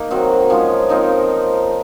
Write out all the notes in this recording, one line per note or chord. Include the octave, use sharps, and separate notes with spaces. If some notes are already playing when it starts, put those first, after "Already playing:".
Already playing: A#3 D#4
D#3 F#3 C4 F#4
F3 G#3 C#4 F4
F3 C4 D#4 A#4